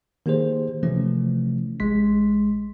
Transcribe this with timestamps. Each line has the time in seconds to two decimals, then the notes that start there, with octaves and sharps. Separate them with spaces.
0.26 D#3 A#3 G4 G#4 C5
0.83 C3 E3 F3 A3 C#4
1.80 A1 G#3 C6 B6